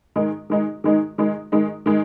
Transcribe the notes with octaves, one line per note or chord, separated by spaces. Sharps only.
D#3 G#3 D#4
D#3 G#3 D#4
D#3 G#3 D#4
D#3 G#3 D#4
D#3 G#3 D#4
D#3 G#3 D#4